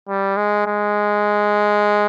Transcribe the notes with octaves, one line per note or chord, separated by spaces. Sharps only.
G3
G#3
G#3